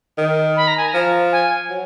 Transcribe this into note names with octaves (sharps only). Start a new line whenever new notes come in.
D#3
B5
A#5
G#5
A#5
F3
G#5
F#3